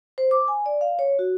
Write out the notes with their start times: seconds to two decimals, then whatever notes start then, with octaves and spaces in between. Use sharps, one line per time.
0.18 C5
0.31 D6
0.48 G#5
0.66 D5
0.81 F5
0.99 C#5
1.19 F#4